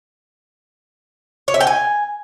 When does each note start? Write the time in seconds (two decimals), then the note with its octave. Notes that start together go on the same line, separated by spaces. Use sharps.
1.48 C#5
1.54 E5
1.60 G5
1.67 G#5